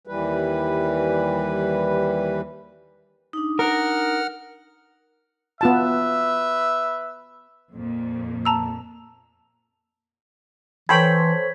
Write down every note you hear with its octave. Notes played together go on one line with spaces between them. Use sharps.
D#2 E3 G3 B4
D4 D#4
A#4 F#5 F6
B3 F4 B4 E5 A5
F2 A#2
A5 A#5 E6
E3 A4 C5 C#5 G5 B5 G#6 B6